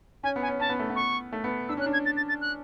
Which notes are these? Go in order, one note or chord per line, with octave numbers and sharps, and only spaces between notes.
C#4 G#5
B3
G#5
C#4
C#4 A5
B3
A3
B3
C#6
A3
B3
D4 E6
C#4 F#6
D4
G#6
A6
A6
A6
F#6